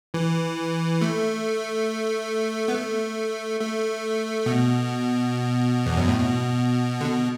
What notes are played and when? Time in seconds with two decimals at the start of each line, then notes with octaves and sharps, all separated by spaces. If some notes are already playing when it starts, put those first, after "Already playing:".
0.14 E3
1.01 A3
2.68 B3
2.74 A3
3.60 A3
4.46 B2
5.86 E2
5.97 F#2
6.08 A2
6.19 B2
7.01 D3
7.05 B2